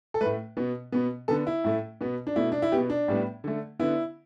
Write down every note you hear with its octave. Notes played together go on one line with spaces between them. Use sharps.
A4
A2 A3 B4
B2 B3
B2 B3
D3 B3 A4
E4
A2 A3
B2 B3
D4
B2 A3 E4
D4
E4
B2 B3 G4
D4
A2 G3 B3
D3 A3
D3 B3 E4